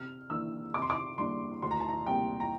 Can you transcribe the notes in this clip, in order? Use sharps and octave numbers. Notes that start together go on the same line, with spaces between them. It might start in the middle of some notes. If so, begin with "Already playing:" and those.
Already playing: C3 F6
E3 A#3 D4 E6
C3 D6
C6
D6
G3 A#3 D4 C6
D2 C6
A#5
A5
A#5
C3 G3 A#3 G5
A#5